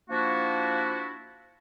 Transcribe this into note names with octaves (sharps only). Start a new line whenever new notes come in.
F3 A#3 D4 E4 F#4